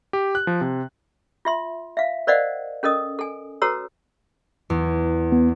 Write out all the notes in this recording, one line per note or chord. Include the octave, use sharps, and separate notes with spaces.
G4
F#6
F3
C3
F4 E5 C6
E5 F5
A#4 C5 D5 D#5 F5 F#5
C#4 A4 A#4 D#5 D#6
A4 G#5
F#4 A4 B4 C#5 A#5 E6
E2
B3